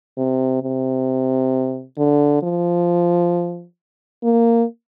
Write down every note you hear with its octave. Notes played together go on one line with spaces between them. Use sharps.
C3
C3
D3
F3
A#3